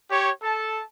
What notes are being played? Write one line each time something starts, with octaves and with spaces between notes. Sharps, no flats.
G4 C#5
A4 A5